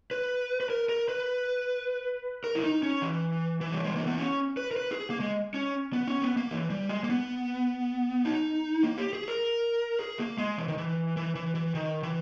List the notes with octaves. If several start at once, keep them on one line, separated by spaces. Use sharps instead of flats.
B4
B4
A#4
A#4
B4
A#4
E4
D#4
C#4
E3
E3
G3
G#3
A#3
B3
C#4
B4
A#4
B4
G#4
A#3
G#3
C#4
B3
C#4
B3
A#3
E3
G3
G#3
A#3
B3
D#4
A#3
G4
G#4
A#4
G#4
A#3
G#3
E3
D#3
E3
E3
E3
E3
D#3
E3